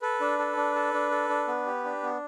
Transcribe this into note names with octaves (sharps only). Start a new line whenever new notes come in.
A4 B4
D4
A4
D4
A4
D4
A4
D4
B3
G4
D4
B3